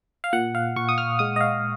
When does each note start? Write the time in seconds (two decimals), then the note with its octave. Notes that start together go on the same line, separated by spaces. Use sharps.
0.24 F5
0.33 A#2 F#5
0.55 F5
0.76 A#2 C#6
0.89 D#6
0.98 F6
1.19 G#3 D#6
1.36 D#5
1.41 F5